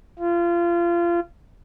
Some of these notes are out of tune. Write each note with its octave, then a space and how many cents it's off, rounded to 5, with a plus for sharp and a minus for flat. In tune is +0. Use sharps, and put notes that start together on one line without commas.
F4 -25